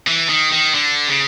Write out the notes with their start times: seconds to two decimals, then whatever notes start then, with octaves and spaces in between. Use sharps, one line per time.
0.07 E3
0.29 D#3
0.52 D#3
0.74 D3
1.08 C#3